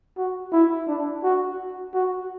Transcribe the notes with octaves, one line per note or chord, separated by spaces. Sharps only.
F#4
E4
D4
F#4
F#4